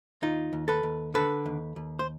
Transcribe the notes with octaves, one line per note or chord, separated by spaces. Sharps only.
D#2 D#4 F4
D#2
A4 B4
D#2
D3 A4 B4
D#2
D#2
C5